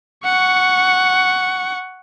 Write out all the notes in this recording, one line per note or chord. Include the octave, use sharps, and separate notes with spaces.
F#5 C#6